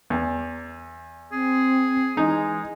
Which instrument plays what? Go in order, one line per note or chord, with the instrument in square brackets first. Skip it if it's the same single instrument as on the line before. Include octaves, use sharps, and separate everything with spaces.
[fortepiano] E2
[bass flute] C4 [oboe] G#4
[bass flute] E3 [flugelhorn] G#3 [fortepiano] D#4